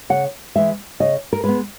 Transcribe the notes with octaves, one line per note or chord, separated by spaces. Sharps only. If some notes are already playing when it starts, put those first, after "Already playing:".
C#3 F#5
E3 G#3 E5
C#3 D#5
A#4
G#3 B3 B4